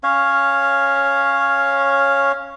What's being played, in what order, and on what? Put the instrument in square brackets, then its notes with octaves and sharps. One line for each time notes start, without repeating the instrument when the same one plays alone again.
[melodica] C#4 C#5 F5